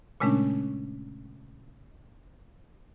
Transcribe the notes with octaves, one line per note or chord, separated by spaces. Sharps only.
A#2 C#3 G#3 A3 C#4 D4